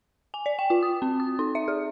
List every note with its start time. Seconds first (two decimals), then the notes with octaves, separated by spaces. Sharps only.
0.34 G#5
0.46 D5
0.59 G5
0.70 F4
0.83 D#6
1.02 C4
1.20 D#6
1.39 D#4
1.55 E5
1.68 G#4